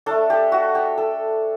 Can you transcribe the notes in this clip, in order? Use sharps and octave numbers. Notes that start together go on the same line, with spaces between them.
A3 D4 A4
G4
F#4
G4
A4